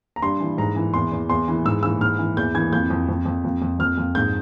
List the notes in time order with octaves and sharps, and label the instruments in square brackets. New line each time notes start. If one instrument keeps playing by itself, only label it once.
[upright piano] A#5
G2 C6
E3
G#2 A#5
E3
E2 C6
E2
E2 C6
E3
G#2 E6
E3 E6
G#2 F6
E3
E2 G6
E3 G#6
F2 G6
F2
F2
F2
F2
F2
F2 F6
F2
G#2 G6